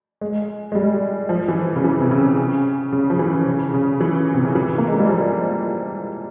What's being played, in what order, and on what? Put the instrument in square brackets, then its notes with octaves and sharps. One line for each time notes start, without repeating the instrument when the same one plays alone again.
[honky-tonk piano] G#3
G#3
G3
F3
E3
C#3
E3
C3
C#3
C#3
F3
E3
C#3
C#3
E3
C3
C#3
E3
A#3
G#3
G3
F3